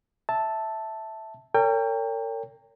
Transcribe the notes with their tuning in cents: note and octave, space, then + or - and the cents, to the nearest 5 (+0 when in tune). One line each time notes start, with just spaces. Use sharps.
E5 -10 A5 +0
A#4 -40 C#5 +30 G5 +25